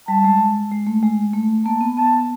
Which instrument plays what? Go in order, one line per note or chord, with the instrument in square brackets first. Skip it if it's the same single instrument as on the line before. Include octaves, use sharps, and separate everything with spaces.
[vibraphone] G3 [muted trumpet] A5
[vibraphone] G#3
G#3
A3
G#3
A3
[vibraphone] A#3 [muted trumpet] A5
[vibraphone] B3
[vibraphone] B3 [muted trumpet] A5